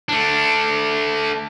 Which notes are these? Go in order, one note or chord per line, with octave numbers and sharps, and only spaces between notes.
A3 D4